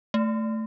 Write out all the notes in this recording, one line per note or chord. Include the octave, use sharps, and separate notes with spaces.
A3